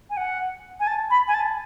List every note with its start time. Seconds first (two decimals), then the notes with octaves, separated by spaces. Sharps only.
0.10 G#5
0.17 F#5
0.80 G#5
0.87 A5
1.10 B5
1.28 G#5
1.34 A5